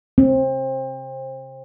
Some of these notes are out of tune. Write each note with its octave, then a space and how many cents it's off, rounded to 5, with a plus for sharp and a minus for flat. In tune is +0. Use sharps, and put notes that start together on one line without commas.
C4 +25